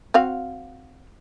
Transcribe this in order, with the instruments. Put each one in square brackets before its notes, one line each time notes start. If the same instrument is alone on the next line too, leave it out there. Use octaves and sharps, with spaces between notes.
[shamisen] C4 F#4 F5